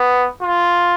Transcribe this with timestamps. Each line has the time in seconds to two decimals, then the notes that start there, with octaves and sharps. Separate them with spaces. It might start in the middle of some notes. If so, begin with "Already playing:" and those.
Already playing: B3
0.42 F4